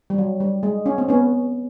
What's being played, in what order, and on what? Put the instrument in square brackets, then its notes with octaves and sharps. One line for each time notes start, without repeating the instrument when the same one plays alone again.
[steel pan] G3
F#3
G3
G#3
C#4
C4
B3 C#4